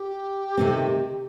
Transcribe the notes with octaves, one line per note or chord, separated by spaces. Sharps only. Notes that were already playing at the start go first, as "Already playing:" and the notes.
Already playing: G4
C3 D#3 A3 C4